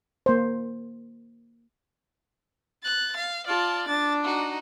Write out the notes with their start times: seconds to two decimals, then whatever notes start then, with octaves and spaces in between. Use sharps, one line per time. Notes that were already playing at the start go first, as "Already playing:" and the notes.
0.26 A#3 C5
2.83 F#6 A6
3.17 F5
3.47 F4 D5 A5
3.88 D4 A6
4.24 D#4 F#4